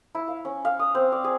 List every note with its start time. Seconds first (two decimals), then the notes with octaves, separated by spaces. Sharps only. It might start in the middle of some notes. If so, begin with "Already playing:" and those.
0.15 E4
0.28 F5
0.45 C#4
0.65 F5
0.79 D#6
0.95 C4
1.12 D5
1.24 G#4